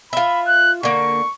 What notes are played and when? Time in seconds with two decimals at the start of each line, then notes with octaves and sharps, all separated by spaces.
0.13 F4 E5 B5
0.48 F#6
0.83 D3 A#3 C#6